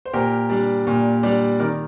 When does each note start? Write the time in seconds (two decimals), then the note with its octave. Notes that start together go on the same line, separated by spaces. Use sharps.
0.05 C5
0.13 A#2 G4 A#4
0.50 G3 D4
0.87 A#2
1.23 G3 D4
1.60 D#3 A#4 D5